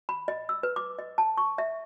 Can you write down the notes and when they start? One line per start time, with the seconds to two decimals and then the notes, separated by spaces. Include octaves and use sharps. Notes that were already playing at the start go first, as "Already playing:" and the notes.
0.09 B5
0.28 D#5
0.49 E6
0.63 B4
0.76 D6
0.99 D#5
1.18 A5
1.38 C#6
1.58 E5